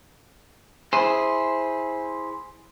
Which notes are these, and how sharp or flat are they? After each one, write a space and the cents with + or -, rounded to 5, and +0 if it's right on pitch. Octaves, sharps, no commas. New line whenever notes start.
E4 -15 G#4 +0 C5 +0